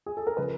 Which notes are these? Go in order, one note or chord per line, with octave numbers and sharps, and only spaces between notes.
G#4
A4
A#4
C#3 F3 B4